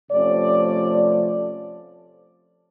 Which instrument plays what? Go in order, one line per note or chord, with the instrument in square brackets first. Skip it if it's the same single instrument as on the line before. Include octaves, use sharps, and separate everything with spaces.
[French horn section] C3 F3 A3 C#4 D5